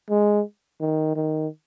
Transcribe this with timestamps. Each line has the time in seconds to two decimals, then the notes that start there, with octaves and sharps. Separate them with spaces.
0.10 G#3
0.81 D#3
1.16 D#3